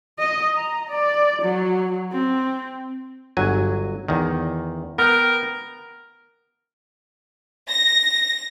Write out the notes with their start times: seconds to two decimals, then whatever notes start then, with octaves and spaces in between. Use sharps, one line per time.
0.20 D#5
0.55 A#5
0.90 D5
1.42 F#3
2.12 C4
3.37 G1 F#3 G#5
4.08 E2 D#3
4.98 B3 A#4 G5
7.69 A#6